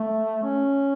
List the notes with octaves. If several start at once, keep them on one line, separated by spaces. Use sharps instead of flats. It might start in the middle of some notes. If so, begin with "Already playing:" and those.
Already playing: A3
C#4